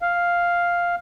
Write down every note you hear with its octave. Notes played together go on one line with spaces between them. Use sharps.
F5